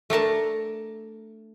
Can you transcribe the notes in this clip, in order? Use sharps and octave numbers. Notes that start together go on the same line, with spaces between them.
A3 D4 A#4 A5